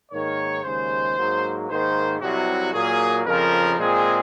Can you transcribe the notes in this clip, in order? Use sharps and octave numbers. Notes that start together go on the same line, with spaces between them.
G#2 D#3 A#3 C#5
D#2 C#3 G#3 C5
G#2 F#3 A#3
G#2 D#3 A#3 C5
C2 C3 F#3 F#4
A#2 F#3 A#3 G#4
F2 C#3 F3 A#4
A#2 G#3 C4 G#4